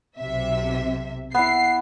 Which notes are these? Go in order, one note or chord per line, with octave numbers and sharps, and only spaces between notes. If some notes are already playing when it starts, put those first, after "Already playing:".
B1 C3 E5
B3 E4 C7